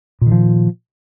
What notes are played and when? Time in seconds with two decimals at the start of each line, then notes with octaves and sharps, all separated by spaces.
0.21 A#2
0.26 D#3
0.31 F3